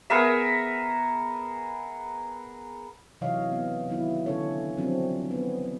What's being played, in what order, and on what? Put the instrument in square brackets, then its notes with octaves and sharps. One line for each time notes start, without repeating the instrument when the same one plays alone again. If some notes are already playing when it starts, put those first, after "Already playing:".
[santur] B3 G#4 A#4 E5
[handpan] C3 E3 F#3 C#5 D#5 F5
B3
D#3 E3 F#3 B3 E4
D3 C#4 A4 C#5
F3 F#3 C4 D4
B3